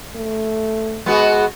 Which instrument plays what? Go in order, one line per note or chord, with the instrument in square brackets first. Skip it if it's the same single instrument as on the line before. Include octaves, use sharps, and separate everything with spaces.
[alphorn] A3
[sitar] G#3 B3 F#4